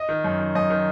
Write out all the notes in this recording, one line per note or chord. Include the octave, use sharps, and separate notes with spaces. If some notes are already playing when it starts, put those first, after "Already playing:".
Already playing: D#5
D#3
F#2
D#3
F#2 D#5
D#3